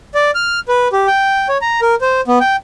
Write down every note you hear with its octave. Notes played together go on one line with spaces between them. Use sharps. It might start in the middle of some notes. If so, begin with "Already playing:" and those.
D5
F6
B4
G4
G5
C#5
A#5
A#4
C5
B3
G5